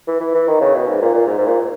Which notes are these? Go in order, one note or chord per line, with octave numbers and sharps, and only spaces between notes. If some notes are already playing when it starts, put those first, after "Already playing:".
E3
E3
E3
D#3
C#3
B2
G#2
A#2
A#2
G#2
G#2
A#2